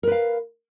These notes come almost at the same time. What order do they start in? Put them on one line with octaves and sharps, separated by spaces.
A#4 B4 F5